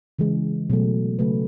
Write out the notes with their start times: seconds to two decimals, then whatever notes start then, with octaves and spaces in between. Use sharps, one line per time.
0.19 C#3 E3 G#3
0.70 B2 F#3 A3
1.19 C#3 F#3 A3 B4